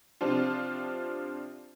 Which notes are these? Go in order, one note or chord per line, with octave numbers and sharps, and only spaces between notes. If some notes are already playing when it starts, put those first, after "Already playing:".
C3 F3 C4 D4 F4